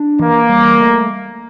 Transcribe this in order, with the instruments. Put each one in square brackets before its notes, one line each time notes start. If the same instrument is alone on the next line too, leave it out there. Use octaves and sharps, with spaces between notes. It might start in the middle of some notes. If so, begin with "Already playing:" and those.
Already playing: [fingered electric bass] D4
[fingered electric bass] E3 [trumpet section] A#3
[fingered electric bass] G3
A3